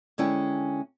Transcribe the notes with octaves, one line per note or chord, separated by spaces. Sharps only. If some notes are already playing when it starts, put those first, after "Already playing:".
D3 G#3 C#4 E4 G5